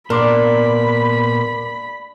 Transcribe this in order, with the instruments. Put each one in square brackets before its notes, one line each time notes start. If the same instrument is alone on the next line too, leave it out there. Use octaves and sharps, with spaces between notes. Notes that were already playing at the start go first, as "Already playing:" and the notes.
[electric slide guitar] A#2 B3 [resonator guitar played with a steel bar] D4 [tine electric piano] A#4 C6 D6 [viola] B5